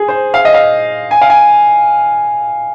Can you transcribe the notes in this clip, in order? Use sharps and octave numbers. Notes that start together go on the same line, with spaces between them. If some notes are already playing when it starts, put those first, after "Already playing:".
Already playing: G#4
C5
F5
D#5
F5
G#5
F5
G#5